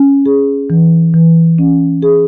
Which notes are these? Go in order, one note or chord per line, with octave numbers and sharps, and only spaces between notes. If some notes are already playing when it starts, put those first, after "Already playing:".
Already playing: C#4
G#4
E3
E3
C#4
G#4